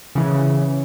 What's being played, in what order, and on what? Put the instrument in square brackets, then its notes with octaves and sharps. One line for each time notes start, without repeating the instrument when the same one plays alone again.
[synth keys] C#3 E3